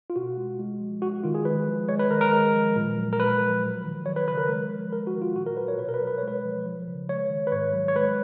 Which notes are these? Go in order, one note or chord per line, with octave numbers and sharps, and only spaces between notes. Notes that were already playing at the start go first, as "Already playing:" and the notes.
F4
B2 F#4
G#3
G#3
F3
G#3 F#4
D#3 F4
G#4
G#3 B4
F3
G#3 C#5
B4
D#3 A#4
A#4
G#3
F3
A#2
F#3
A#4
G#3 B4
F3
F#3
D#3
F#3 C#5
B4
C#3 B4
A#4
G#3
F3
G#3 A#4
F#4
D#3
F4
A#2 F#4
A#4
F#3 B4
C#5
B2 B4
A#4
B4
F#3
B4
G#3 C#5
B4
F3
F3
C#3
G#3 C#5
D#3
B4
G#2 C#5
F#3
C#5
G#3 B4